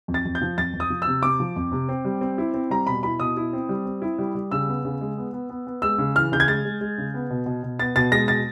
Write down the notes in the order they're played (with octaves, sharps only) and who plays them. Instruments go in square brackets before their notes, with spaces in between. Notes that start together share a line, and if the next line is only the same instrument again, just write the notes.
[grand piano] F2
A6
F2
G6
F3
F2 A6
F2
D#6
F3
E6
C3
C3 D6
F3
F2
C3
C4
G3
C4
E4
C4
G3 A#5
B2 B5
E4 B5
B2 D#6
E4
C4
G3
C4
E4
G3
G3
C#3 E6
B3
C#3
G#3
B3
B3
B3
B3
G#3 E6
C#3
E3 F6
C#3 G6
G#6
G#3 A6
G#3
G#3
C#3
B3
B2
B2
B2
B3 A6
B2 A6
G#3 A#6
B2 A6